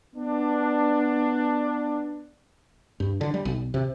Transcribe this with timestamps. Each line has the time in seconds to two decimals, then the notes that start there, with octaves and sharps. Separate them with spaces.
0.15 B3 D4
3.00 G2
3.21 D3
3.34 G3
3.45 B1
3.74 C3